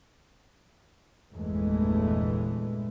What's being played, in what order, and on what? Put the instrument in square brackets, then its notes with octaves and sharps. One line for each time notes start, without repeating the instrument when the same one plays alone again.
[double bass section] G1 E2 A#2 E3 G#3 A3